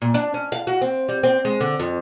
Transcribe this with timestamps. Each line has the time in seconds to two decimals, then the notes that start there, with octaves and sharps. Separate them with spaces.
0.02 A#2
0.14 D4
0.34 C#4
0.52 F5
0.67 F#4
0.81 C4
1.09 G3
1.23 C4
1.45 G#3
1.60 D3
1.80 F2